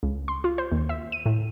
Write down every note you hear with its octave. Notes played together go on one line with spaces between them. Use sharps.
C#2
C6
F4
C5
D#2
E5
D#7
A2